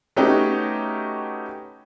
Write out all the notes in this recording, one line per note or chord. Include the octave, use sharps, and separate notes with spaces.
A3 B3 C#4 D#4 F#4 G4